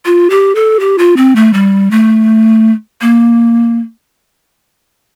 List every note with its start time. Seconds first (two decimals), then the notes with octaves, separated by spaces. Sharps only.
0.06 F4
0.30 G4
0.55 A4
0.80 G4
0.98 F4
1.17 C4
1.36 A3
1.54 G3
1.91 A3
3.02 A#3